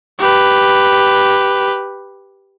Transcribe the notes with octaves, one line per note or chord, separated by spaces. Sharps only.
G4 B4